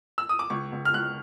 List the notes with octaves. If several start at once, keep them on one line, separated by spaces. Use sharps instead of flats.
E6
D#6
D6
C#2 C#6
C#2
F6
C#2 F#6